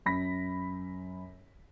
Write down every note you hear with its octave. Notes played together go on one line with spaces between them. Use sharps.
F#2 B5 A#6 B6